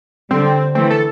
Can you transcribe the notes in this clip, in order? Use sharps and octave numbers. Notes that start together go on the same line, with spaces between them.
D3 G3 C4
E3 A3 C4
A4